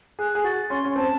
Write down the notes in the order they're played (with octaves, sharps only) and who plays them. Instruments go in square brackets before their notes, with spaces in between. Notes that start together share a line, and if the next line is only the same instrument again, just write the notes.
[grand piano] G#4 [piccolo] F#6
[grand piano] G#4
[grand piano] F#4 [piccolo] A6
[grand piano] C#4 [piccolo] C6
[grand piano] C#4
[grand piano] C4 [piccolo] A5